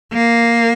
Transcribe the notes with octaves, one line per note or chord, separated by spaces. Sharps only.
A#3